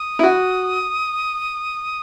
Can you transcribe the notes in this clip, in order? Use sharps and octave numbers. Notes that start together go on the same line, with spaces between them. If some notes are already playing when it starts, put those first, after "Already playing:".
Already playing: D#6
E4
F#4